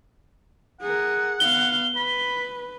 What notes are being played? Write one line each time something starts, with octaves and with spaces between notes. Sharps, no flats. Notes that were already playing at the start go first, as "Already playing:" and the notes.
G#4 A#4 F#5
B3 F5 G7
B4 B5